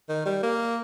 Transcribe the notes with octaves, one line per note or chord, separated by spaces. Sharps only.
D#3
G3
A#3